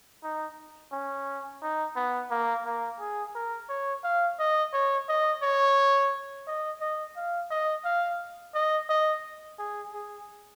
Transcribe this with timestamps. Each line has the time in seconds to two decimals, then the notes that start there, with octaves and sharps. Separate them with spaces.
0.23 D#4
0.92 C#4
1.62 D#4
1.96 B3
2.31 A#3
2.65 A#3
3.00 G#4
3.35 A#4
3.69 C#5
4.04 F5
4.39 D#5
4.73 C#5
5.09 D#5
5.42 C#5
6.47 D#5
6.81 D#5
7.17 F5
7.51 D#5
7.85 F5
8.54 D#5
8.89 D#5
9.59 G#4
9.93 G#4